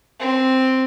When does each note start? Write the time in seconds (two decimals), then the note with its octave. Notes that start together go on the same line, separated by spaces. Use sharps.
0.20 C4